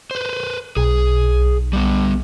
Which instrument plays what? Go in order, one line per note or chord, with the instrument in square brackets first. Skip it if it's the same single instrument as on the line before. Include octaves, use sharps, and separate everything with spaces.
[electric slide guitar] B4 C5
[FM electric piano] B1 [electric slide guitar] G#4
[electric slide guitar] G3 B3